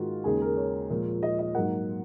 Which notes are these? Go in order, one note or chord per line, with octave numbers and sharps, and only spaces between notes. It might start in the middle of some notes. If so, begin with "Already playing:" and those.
Already playing: G#2 D#3 G#3 F4 F#4
D#2 C#3 G#3 G#4
A#4
C#5
A#2 F3 G#3
D#5
D#5
G#2 F#3 A#3 F#5